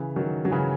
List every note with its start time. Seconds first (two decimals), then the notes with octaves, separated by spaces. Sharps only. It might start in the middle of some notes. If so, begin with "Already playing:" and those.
Already playing: C#3 E3
0.16 D#3 F#3
0.45 F#3
0.51 C#3 E3